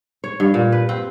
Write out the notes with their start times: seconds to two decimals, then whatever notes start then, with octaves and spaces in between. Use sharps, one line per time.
0.24 C#5
0.40 G2
0.54 A#2
0.72 B4
0.89 C4